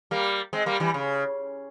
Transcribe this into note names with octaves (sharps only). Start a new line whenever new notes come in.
G3 A#3
G#3 C4
G3 A#3
E3 G3
C#3